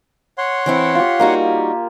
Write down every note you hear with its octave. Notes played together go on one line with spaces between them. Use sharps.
C#5 F#5 C6
E3 C4 E4
F4 G4
G3 A#3 D#4 F#4